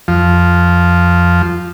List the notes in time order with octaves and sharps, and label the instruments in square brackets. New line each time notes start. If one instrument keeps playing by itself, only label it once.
[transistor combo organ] F2 F3